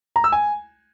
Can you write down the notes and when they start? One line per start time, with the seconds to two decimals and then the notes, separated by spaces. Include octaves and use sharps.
0.16 A#5
0.24 E6
0.32 G#5